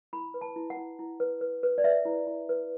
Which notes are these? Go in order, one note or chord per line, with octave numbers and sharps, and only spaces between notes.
E4 B5
B4
A5
E4
F#5
E4
E4
B4
B4
B4
D5
B4 E5
E4
E4
B4